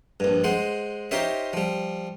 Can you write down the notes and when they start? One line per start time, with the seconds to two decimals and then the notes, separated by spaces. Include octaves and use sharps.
0.20 A#1 G2
0.44 G#3 C5 F#5
1.11 D#4 F4 G4 C5 C#5 E5
1.53 F3 G3